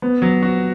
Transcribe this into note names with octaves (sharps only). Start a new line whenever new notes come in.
B3
F#3
F#4